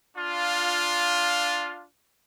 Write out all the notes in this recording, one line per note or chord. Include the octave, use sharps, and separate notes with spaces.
D4 F4